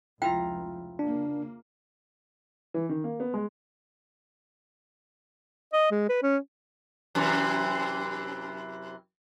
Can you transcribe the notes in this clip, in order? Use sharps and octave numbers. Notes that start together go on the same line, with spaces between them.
F1 C#2 F3 E4 F4 G5 A#5
C#3 A#3 D4
E3
D#3
A#3
B3
G#3
D#5
G#3
B4
C#4
F#2 C3 E3